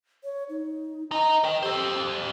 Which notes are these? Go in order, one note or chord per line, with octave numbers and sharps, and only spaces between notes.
C#5
D#4
D#4 D#5 A#5
A#4 G5
G4 A4 C5